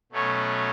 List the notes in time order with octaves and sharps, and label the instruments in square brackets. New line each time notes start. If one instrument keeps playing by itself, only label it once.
[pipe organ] B2 F#3 A3 C#4